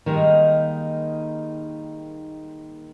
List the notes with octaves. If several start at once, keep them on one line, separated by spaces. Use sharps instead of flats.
D#3 G3 G#3 A#3 D#4